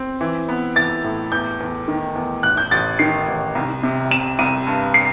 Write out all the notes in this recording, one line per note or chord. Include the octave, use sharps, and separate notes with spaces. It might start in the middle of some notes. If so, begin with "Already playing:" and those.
Already playing: C4
E3
B3
E3 A6
A2
E2 G6
E2
D#3
E2
A1 F#6
G6
A1 A6
D#3 C7
A1
C2
C3
C3 E7
C2 D#7
G2
C7